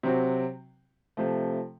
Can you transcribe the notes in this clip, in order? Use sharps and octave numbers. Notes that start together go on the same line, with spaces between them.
C3 F#3 C4 F#4
C3 F3 A3